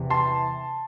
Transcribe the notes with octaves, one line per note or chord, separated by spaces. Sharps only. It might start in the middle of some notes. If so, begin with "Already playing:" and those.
Already playing: E2 C3 E3
A5 C6